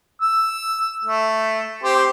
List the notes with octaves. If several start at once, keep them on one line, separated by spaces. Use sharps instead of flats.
E6
A3
C4 G4 C5